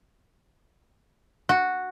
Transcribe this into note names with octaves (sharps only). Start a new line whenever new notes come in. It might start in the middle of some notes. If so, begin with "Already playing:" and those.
F#4